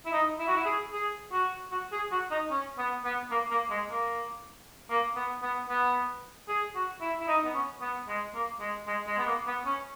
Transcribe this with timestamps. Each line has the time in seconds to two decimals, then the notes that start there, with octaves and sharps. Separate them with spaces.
0.06 E4
0.13 D#4
0.40 E4
0.48 F#4
0.56 E4
0.66 G#4
0.93 G#4
1.32 F#4
1.72 F#4
1.92 G#4
2.12 F#4
2.31 D#4
2.51 C#4
2.78 B3
3.05 B3
3.31 A#3
3.51 A#3
3.71 G#3
3.90 A#3
4.90 A#3
5.16 B3
5.43 B3
5.69 B3
6.49 G#4
6.75 F#4
7.01 E4
7.20 E4
7.28 D#4
7.45 B3
7.54 C#4
7.81 B3
8.08 G#3
8.35 A#3
8.60 G#3
8.87 G#3
9.08 G#3
9.18 B3
9.27 A#3
9.47 B3
9.66 C#4